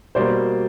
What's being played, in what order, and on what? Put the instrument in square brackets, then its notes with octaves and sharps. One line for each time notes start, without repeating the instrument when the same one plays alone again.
[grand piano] B2 G3 A#3 C5 D5